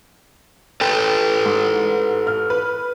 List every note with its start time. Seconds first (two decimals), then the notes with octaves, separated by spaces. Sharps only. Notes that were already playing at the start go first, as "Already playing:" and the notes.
0.81 A4 B4 G5
1.45 G#2
2.27 F6
2.50 B4